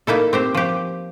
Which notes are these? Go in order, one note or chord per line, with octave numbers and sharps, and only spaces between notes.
A#3 D#4 E4 A4
C4 G4 C5
F3 G4